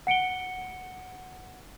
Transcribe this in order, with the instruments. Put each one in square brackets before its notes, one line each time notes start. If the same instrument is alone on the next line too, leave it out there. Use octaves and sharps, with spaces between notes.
[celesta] F#5 C#7 D7 G7